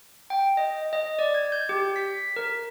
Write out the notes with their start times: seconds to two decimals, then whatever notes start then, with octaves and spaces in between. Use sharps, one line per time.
0.30 G5
0.57 D#5
0.93 D#5
1.19 D5
1.35 G#6
1.52 G6
1.69 G4
1.96 B6
2.36 A#4